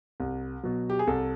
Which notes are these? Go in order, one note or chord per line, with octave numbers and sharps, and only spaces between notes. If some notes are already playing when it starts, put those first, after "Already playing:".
C2
B2 F#3
G4
G#4
C2 A4